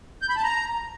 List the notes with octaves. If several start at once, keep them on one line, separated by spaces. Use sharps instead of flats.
G6
B5
A5
A#5